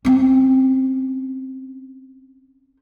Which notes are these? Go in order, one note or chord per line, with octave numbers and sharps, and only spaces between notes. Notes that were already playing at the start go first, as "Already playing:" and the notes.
C4 C#4